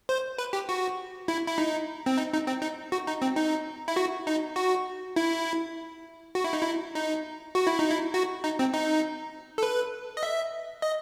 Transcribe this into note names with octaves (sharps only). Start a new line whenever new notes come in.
C5
B4
G4
F#4
E4
E4
D#4
C4
D#4
D#4
C4
D#4
F#4
D#4
C4
D#4
E4
F#4
D#4
F#4
E4
F#4
E4
D#4
E4
D#4
F#4
E4
D#4
E4
F#4
D#4
C4
D#4
A4
B4
D#5
E5
D#5